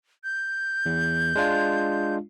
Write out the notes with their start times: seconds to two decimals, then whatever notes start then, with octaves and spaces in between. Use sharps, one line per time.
0.24 G6
0.86 E2
1.35 G#3 D4 F4